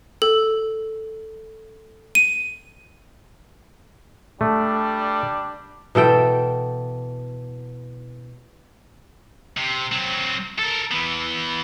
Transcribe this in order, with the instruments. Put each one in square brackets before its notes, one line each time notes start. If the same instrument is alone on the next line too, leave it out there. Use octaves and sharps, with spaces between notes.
[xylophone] A4
D#7
[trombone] G3 [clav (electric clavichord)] A3 [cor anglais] D4
[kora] B2 E3 A4 G5
[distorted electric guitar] C3
F#3 C4
A4 A#4
E3 B3